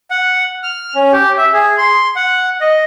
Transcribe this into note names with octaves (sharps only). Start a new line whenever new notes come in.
F#5
F6
C#4
G4
E5
G#4
C6
F#5
D#5